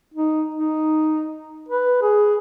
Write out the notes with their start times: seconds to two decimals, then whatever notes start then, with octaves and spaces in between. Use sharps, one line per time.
0.14 D#4
0.55 D#4
1.69 B4
2.02 G#4